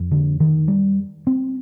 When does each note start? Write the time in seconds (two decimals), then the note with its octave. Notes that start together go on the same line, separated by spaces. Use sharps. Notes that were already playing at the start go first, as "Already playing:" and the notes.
Already playing: F2
0.11 D3
0.40 D#3
0.68 G3
1.27 C4